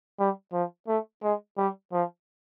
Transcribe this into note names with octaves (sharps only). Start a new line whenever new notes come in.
G3
F3
A3
G#3
G3
F3